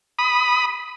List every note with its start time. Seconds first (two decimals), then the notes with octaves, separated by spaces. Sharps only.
0.19 B5 D#6